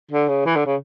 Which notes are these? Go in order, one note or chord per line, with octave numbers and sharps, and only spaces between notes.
D3
C#3
E3
D3
C#3